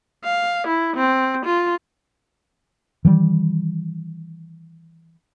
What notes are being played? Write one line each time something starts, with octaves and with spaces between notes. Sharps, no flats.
F5
E4
C4
F4
D#3 E3 G3